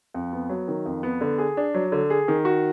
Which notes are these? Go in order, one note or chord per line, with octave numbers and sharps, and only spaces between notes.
F2
B3
F#3
D#3
F2
B3
D3
G#4
D4
F#3
D3
G#4
D#3
F#4